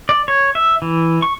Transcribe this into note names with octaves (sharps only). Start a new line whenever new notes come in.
D5
C#5
E5
E3
C#6